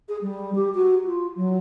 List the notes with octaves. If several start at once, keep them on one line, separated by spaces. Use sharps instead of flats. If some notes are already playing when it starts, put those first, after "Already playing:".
G#4
G3
G4
F#4
F4
F#3